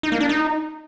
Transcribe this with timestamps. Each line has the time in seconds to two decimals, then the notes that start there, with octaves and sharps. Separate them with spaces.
0.03 D#4
0.12 A#3
0.21 D4
0.29 D#4